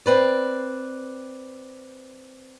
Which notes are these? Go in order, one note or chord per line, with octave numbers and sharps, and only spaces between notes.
C4 B4 D5